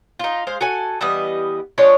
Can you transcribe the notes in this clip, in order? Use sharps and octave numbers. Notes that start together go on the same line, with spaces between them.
D#4 F4
G#3 C5 F5
F#4 A4 G#5
E3 G3 B3 D#5
F3 G#3 D4 C#5